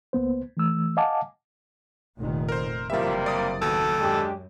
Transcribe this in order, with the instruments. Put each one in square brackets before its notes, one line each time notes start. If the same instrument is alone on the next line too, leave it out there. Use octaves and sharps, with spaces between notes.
[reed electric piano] C#2 A#3 B3 C5
E3 A3 E6
D#5 F5 F#5 G#5 A5 D6
[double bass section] F1 A#2 D#3
[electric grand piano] A#4 C5
[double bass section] F#1 [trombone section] C3 G3 A#3 [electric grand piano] F3 E5
[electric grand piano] D5 D#6
[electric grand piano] D#2 B2 [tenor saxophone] A4
[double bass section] F#2 [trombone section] G#3 D4 G4